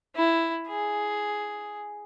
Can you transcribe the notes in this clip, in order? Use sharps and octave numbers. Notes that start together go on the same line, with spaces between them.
E4
G#4